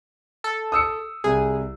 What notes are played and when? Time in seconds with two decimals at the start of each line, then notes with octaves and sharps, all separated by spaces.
0.44 A4
0.72 D#6 E6 C#7
1.24 C2 G#4